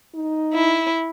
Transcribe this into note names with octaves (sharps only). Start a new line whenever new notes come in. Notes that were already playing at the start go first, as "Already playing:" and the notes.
D#4
E4